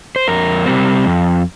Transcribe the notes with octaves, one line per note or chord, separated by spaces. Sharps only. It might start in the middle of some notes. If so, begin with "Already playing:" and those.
C5
F2 A#4
C3 G3 C4
F2